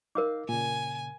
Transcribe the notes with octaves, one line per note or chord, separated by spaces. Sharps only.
D#4 A#4 F5 D6
A#2 C#3 G#5